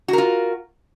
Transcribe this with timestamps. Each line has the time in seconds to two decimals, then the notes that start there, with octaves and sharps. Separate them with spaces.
0.08 F#4
0.13 A#4
0.18 F4